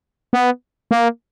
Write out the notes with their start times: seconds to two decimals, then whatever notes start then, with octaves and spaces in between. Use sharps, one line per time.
0.33 B3
0.91 A#3